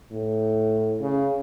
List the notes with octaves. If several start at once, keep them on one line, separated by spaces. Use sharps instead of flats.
A2
C#3